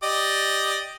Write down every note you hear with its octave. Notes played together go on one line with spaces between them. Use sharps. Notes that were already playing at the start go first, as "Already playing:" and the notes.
G4 D5 D#5